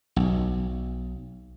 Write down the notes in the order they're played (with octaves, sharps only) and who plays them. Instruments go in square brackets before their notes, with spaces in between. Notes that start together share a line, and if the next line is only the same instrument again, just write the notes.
[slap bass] B1